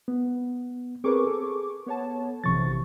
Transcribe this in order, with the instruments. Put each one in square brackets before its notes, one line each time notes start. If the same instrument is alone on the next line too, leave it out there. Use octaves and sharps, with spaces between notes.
[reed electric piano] B3
[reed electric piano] C4 A#4 B4 [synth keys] G#4 C#6 D6
[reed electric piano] A4
[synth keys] B3 C#5 A5
[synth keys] A#1 C3 F3 [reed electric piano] E3 C#6 A6